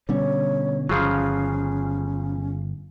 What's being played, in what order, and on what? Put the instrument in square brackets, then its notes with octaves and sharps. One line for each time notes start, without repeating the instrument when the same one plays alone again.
[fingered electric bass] B2 D3 C#4 [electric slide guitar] G3 [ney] C#5
[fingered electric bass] G1 [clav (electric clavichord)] C#3 F3 F#3 [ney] C#4 [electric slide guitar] F4 G#4 F5